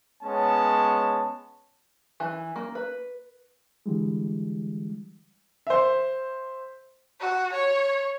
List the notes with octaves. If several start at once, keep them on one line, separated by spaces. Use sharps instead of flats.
G#3 B3 C#4 C#5 A5
E3
A#3
B4
D3 E3 G3 G#3
C5 E5
F#4
C#5